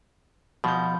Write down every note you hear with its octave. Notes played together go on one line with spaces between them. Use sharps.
B2 F3 G6